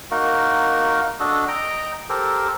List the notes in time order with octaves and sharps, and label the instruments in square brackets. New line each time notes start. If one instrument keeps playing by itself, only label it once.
[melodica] A#3 D#4 F#4 A#4
D4 F#4 A4 D#5
D#5 G5 A#5
G4 A4 A#4 C5